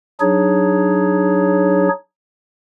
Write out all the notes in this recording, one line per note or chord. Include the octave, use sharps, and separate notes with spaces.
F#3 D4 D#4 G#4 C#5